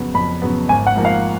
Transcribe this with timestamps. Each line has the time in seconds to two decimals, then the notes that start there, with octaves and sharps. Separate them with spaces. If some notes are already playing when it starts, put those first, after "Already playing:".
Already playing: F2 C#3 F#3 B3
0.14 F2 B5
0.42 C#3 F#3 B3
0.69 G#1 G#5
0.87 F#5
0.95 G#2 F3 A#3
1.05 F5